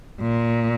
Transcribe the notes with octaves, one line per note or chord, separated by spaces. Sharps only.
A#2